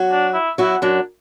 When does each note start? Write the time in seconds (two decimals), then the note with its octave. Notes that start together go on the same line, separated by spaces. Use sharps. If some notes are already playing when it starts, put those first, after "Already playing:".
Already playing: F#3 F#4
0.11 D4
0.34 E4
0.58 F#3 E4 F#4
0.82 F#2 F#3 D4